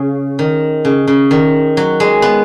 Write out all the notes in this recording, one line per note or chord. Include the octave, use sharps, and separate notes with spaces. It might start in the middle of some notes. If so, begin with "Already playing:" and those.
Already playing: C#3
D#3
C#3
C#3
D#3
F#3
G#3
B3